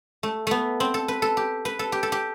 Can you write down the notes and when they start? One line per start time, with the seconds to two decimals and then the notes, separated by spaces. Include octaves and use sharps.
0.23 A3
0.47 A3 B3
0.80 C4
0.94 A4
1.08 B4
1.22 A4
1.37 G4
1.65 B4
1.79 A4
1.92 G4
2.03 A4
2.12 G4